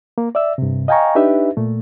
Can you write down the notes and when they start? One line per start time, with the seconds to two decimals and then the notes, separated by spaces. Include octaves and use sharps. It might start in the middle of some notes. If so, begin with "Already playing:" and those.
0.18 A#3
0.35 D5 E5 E6
0.58 G2 C3
0.88 D#5 F5 G5 G#5 A#5 C#6
1.15 D4 D#4 G4 B4 E5
1.57 A#2 A3